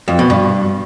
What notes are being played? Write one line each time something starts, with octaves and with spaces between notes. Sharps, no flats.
F2
B2
G2